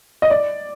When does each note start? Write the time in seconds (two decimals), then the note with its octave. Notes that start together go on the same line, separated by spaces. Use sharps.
0.22 D#5
0.30 D5